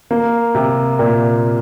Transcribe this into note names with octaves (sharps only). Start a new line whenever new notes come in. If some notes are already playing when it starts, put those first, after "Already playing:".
A#3
C3
A#2